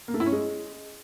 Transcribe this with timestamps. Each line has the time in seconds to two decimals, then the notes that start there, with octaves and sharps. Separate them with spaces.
0.08 A#3
0.14 A3
0.20 E4
0.26 C#4
0.32 G#3